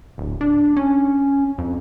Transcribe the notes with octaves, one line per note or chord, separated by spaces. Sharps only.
D1
D4
C#4
F2